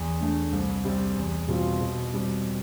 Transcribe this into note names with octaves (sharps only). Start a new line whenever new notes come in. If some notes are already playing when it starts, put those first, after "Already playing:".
Already playing: E2
D3 A3
C2
C3 G3 C4
E2
B2 G3 C4 F4
B2
G3 C4